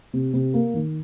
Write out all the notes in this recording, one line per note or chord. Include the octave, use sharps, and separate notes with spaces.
C3
C3
A#3
D#3